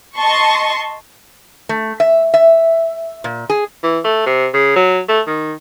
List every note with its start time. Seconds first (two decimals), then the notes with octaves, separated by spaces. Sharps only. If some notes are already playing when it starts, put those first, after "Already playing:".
0.16 D#5 A5 C6 C#6
1.69 A3
2.00 E5
2.34 E5
3.24 A#2
3.50 G#4
3.83 E3
4.04 A3
4.26 C3
4.54 C#3
4.76 F#3
5.08 A3
5.27 D#3